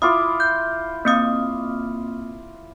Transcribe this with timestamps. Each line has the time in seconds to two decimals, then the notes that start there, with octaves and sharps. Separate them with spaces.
0.02 E4 F4 D6 D#6
0.40 G6
1.05 A#3 C4 D#6